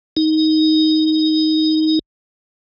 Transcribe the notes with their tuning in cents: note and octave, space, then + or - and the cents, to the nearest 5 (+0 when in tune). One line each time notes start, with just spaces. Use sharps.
D#4 +10